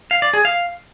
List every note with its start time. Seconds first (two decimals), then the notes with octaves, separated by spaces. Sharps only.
0.11 F5
0.22 D5
0.33 G#4
0.45 F5